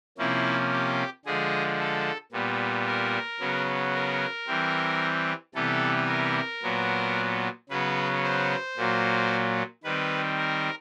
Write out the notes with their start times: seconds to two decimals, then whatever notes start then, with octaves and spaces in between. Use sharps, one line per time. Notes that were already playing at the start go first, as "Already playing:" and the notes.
0.18 C3 F3 A#3 C#4 E4
0.72 G4
1.25 D3 F3 G#3 G#4
1.80 A4
2.32 A#2 G3 B3
2.87 A#4
3.40 C#3 F#3 B3
3.94 A#4
4.47 E3 G3 C4
5.54 C3 E3 G3 B3 A4
6.08 A#4
6.63 A#2 F#3 B3
7.69 C#3 F#3 B3 B4
8.24 C5
8.77 A#2 F#3 A#3
9.84 D#3 G3 C4 B4
10.37 A#4